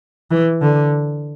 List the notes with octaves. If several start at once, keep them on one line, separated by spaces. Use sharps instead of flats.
E3
D3